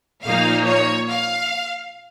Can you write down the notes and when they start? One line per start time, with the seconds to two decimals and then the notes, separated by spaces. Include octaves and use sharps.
0.24 A#2 F3 A#3 D#4 F5
0.66 C#5
1.09 F5